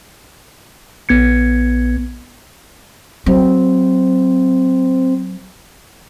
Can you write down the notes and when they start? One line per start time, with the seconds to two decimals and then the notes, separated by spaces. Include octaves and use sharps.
1.09 A#1 B3 G#6 C#7
3.26 F#3 C4